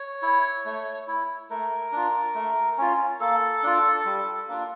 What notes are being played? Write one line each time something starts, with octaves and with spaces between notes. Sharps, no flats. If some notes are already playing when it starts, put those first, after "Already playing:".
Already playing: C#5
E4
A3
E4
A3 A#4
D4 F4
A3
C#4 F4
A#3 A4
D4 F4
G3
A#3 D4 F4